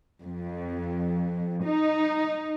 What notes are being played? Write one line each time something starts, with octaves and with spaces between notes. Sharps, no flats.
F2
D#4